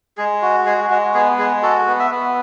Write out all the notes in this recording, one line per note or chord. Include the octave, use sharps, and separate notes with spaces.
G#3 G#4
F#4
G#3 G#4
G#3 F#4
B3 G#4
G#3 G#4
F#4 A4
B3
E5
B3